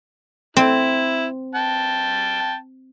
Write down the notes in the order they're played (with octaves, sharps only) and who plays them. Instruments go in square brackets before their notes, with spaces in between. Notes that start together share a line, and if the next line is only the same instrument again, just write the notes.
[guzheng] C4 [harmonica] E4
[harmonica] G5 A5